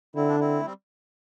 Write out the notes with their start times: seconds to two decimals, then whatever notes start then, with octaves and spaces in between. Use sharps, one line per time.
0.15 D3 C4 E4
0.29 D4
0.40 C4 E4
0.60 A3
0.65 G3 C4